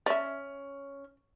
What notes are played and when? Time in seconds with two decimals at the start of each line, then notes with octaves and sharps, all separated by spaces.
0.06 C#4 D5 E5